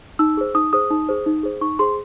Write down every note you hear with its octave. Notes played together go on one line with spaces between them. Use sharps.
D#4 E6
G#4 C5
D#4 D#6
G#4 C5 D#6
D#4
G#4 C5
D#4
G#4 C5
D#4 C#6
G#4 C5 C6